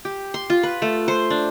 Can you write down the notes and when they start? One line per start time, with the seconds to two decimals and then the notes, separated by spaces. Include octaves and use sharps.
0.05 G4
0.34 C6
0.50 F4
0.63 B4
0.82 A3
1.08 C5
1.30 D4